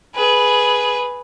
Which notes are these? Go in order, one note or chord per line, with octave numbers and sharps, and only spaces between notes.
G#4 B4